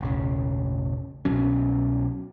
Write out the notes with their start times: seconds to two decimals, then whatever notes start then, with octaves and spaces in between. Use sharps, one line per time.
0.01 E1 A1 C#3
1.25 C2 B2 F#3 C#4